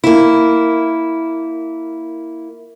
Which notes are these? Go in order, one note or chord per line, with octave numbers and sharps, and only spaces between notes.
A#3 E4